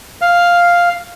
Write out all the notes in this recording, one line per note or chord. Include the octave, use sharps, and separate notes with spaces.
F5